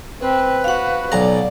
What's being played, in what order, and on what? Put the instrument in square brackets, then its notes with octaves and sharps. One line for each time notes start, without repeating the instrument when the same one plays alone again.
[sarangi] C4 [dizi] B4
[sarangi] F#4 [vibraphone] F5 F#5
[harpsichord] B1 A#5 [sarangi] D5